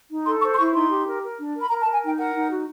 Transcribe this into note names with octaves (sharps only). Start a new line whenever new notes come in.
D#4
A4 C6
C5 C#6
C6
E4 C#6
D#4 C6
G4
A#4
A#4
D4
A#4
B5
A#4 A#5
A5
A#4
G#5
D#4 G5
A#4 F#5
D#4
F#4